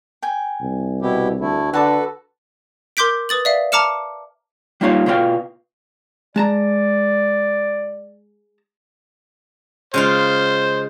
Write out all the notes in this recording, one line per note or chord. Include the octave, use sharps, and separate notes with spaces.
G5 G#5
C2
B2 E4 G4
D2 A3 E4
D3 F#4 A4 B4 A5 D6
A#4 C6 D6 G6 B6 D7
B4 D#6 A6 F#7
D5 E5 F5
A5 A#5 D6 F6 C#7 E7
G3 A#3 D#4 F4 C#5 F5
B2 F4 C5 F5 G5
G#3 D5 A5 A#5
C#3 G#3 F4 C5